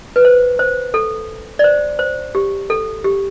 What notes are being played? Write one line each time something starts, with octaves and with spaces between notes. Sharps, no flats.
B4
C5
C5
A4
D5
C5
C5
G4
A4
G4